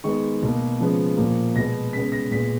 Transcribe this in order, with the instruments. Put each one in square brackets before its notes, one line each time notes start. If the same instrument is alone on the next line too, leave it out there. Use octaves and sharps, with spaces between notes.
[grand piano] D#3 G#3 B3 C#6
B2 A#3
C#3 F3 G#3 B3
A#2 F3 A#3
B2 G#3 B3 A#6
C#3 G#3 B3 B6
A#6
A#2 G#3 B3 B6